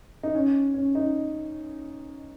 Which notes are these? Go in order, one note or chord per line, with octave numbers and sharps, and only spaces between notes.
D#4
C#4
C#4
D#4